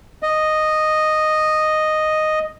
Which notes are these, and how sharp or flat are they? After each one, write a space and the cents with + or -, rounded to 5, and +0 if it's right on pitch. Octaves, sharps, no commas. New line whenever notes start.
D#5 -5